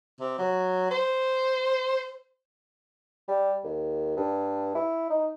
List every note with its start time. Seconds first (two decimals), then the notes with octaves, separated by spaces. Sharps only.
0.20 C3
0.39 F#3
0.91 C5
3.28 G3
3.64 D#2
4.17 G2
4.75 E4
5.10 D#4